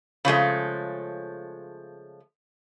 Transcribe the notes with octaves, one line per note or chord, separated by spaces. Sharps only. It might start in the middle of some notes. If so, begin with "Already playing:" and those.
C#3 F3 G#3 A3